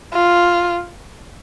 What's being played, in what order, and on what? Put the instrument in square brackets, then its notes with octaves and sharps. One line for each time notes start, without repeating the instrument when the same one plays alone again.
[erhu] F4